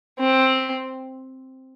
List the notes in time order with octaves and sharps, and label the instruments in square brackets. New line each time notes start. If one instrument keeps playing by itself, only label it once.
[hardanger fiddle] C4